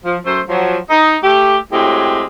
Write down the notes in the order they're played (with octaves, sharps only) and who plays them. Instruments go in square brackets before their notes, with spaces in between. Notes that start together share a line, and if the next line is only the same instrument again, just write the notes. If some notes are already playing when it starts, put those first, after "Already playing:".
[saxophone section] F3
F#2 A3 C5
F3 F#3
D#4
A3 G4
A2 F#3 G#3 C4 G4